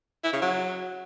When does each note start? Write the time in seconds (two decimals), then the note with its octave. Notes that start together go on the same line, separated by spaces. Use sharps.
0.24 E4
0.33 C#3
0.42 F#3